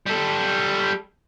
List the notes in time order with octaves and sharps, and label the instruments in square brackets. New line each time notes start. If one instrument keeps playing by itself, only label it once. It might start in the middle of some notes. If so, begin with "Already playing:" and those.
[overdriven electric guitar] G3 A4